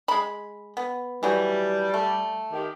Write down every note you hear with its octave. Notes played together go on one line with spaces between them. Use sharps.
G#3 B5
B3
E3 F#3 G3 A3
A3
D#3 G4